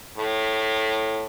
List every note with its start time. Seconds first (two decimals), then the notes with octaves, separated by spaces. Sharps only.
0.17 A2